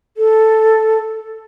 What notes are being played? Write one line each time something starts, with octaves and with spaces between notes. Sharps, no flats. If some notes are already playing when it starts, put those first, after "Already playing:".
A4